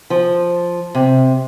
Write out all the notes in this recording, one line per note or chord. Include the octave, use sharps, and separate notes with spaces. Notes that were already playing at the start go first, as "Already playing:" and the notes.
F3
C3